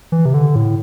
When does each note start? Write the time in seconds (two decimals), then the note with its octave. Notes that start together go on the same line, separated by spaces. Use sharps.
0.12 E3
0.26 C3
0.34 D3
0.56 A2